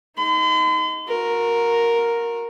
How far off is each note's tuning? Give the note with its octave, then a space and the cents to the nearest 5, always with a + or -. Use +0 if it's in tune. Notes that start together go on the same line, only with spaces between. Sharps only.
D#4 +25 C6 -45
F#4 -35 A#4 +0